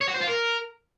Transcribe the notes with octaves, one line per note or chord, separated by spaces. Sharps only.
C#5
F#4
C5
F4
A#4